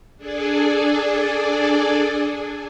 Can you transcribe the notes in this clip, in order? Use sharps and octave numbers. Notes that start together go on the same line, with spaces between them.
D4 G#4 A4 D5 G#5